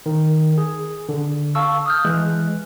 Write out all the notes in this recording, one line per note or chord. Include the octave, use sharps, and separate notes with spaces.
D#3
G#4
D3
F5 A5 C#6 E6
D#6 F6 G6
E3 G#3 F#6